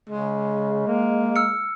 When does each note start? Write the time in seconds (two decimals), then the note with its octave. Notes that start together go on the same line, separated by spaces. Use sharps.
0.10 C#3 G#3
0.87 A#3
1.36 E6 F6 C#7